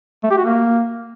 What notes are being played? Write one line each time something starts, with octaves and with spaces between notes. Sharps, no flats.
A3
G4
F#4
A#3